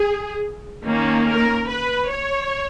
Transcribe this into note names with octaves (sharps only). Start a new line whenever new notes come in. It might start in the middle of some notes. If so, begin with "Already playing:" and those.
Already playing: G#4
D#3 A#3 C#4
A#4
B4
C#5